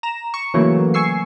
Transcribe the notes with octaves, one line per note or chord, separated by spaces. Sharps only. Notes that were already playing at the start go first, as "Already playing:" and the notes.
A#5 E7
C#6
C#3 E3 F#3 A3 A#3
G#5 C#6 E6 C7